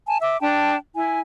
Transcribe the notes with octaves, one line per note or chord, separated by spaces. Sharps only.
G#5 A5
E5 D6
D4 G5 A5
E4 G#5